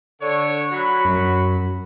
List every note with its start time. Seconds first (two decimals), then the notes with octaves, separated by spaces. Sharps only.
0.21 D3 C#5
0.72 F#3 F#4 B5
1.05 F#2